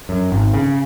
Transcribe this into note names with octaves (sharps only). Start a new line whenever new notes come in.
F#2
G#1
C#3